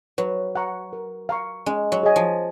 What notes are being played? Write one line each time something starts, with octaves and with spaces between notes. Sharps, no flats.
F#3 B4
F#5 A#5 C#6
A#4
F5 A#5 C#6
G#3 C#4
F#3
G#4 D#5 G#5
F3